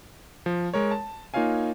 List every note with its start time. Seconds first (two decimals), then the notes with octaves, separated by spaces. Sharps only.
0.46 F3
0.74 G#3 A#4 C#5
0.91 A5
1.34 A#3 D#4 F4 C#5 F5 G#5